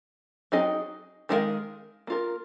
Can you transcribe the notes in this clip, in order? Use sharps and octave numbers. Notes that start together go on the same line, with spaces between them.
F#3 C4 D#4 G#4 D#5
D#3 G#3 D#4 A#4 F5
A#3 F4 A#4